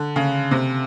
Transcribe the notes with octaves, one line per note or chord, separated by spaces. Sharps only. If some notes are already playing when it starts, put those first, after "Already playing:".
Already playing: D3
C#3
C3